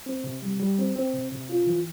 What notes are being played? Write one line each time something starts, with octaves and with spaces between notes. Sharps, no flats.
C4
C3
G3
G3
C4
C4
C3
C3
F4
E3